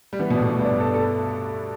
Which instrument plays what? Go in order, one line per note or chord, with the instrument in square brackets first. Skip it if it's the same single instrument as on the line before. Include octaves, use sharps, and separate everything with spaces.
[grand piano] G3
[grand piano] E3 [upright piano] B3
[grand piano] B2
[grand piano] A2 [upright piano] D4
[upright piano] B3
[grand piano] G2
[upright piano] D4
A4
A4